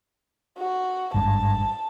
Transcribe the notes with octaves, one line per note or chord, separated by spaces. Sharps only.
F#4
G#1 G2 A5